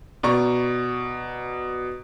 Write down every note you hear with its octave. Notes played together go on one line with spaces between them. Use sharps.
B2 D5 A#5 C#6